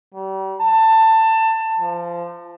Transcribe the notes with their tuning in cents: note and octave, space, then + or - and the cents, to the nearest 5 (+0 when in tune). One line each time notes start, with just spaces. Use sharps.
G3 -35
A5 +20
F3 -20